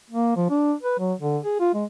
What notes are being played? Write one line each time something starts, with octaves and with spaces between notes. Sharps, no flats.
A#3
F3
D4
B4
F#3
D3
G#4
F4
G#3